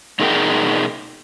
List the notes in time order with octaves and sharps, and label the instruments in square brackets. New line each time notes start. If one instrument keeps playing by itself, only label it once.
[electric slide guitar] B2 D#4 G#4 A#4 F#5 G5